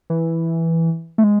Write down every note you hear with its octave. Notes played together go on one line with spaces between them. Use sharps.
E3
A3
G#3